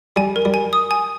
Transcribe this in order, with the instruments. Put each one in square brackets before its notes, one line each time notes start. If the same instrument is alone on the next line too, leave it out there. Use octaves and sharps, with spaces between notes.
[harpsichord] G3 [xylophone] G#5
[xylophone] A#4
[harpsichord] G3
[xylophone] G#5
D#6
G#5